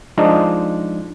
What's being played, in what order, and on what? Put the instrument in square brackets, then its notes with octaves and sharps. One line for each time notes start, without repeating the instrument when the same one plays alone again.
[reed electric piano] F3 G#3 D4 D#4